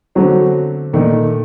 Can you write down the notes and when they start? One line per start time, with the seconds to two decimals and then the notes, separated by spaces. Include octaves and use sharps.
0.15 D3 F#3 A3 C4
0.93 A#2 D#3 A3 D4